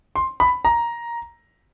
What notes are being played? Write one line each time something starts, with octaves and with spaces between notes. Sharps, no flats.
C6
B5
A#5